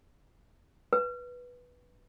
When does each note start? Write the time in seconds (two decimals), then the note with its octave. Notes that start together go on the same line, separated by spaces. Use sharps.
0.93 B4